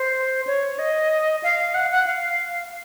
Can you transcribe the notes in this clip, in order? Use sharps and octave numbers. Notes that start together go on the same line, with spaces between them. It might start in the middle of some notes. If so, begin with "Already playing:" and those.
Already playing: C5
C#5
D#5
F5
F#5
F#5
F5